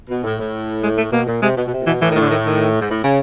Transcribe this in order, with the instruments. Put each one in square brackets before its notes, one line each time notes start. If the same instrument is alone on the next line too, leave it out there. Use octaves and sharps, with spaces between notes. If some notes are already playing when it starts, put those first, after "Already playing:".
[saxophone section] B2
A2
A2
[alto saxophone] G#3
A3
[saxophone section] B2 [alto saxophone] A#3
[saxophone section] A#2
[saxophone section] C3 [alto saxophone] G#3
[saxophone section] B2
B2
C3
A#2
[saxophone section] B2 [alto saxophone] E3
[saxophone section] A2 [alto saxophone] E3
[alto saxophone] D#3
[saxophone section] A2
[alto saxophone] D3
D#3
D#3
[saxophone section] G#2
A2
C#3